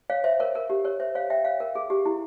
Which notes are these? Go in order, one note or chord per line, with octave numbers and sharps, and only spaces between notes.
C#5 F5
C5 E5
A#4 C#5
A#4
G4
A#4 C#5
C5 E5
C#5 F5
E5 G5
C#5 F5
A#4
G#4
G4
E4